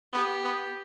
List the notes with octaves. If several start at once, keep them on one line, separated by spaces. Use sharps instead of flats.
B3 G4
B3